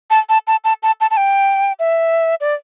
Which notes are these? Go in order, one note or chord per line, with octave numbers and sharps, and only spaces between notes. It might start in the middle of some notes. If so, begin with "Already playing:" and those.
A5
A5
A5
A5
A5
A5
A5
G5
E5
D5